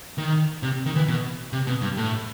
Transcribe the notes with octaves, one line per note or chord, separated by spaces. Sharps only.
D#3
C3
D#3
E3
B2
C3
B2
G2
A2